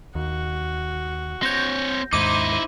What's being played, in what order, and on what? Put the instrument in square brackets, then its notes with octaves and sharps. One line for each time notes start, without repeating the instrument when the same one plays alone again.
[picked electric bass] D#2 [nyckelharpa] F#4
[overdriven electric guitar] C4 C#5 [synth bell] G6 A#6
[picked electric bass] D#2 G#2 [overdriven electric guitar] D#4 E4 [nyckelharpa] C5 [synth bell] D6 D#7